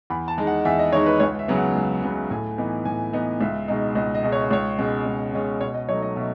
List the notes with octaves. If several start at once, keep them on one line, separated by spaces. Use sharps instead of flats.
E2 B5
A5
D#3 G#3 D#4
F#5
E2 E5
D#5
D#3 G#3 D#4 C#5
B4
C#2 C#5
E5
C#3 F#3 B3
F#5
C#2
C#3 F#3 B3
A2 G#5
E3 B3 D#4
A2 G#5
E3 B3 D#4
C#2 E5
B2 G#3 D#4
C#2 D#5
D#5
B2 G#3 D#4
C#5
D#5
C#2 C#5
B2 G#3 C#4
C#2
B2 G#3 C#4
B2 C#5
D#5
F#3 A3 D#4 C#5
D#5
B2 E5